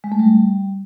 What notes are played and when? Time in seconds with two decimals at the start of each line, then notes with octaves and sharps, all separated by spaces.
0.04 G#3
0.12 A3
0.19 G3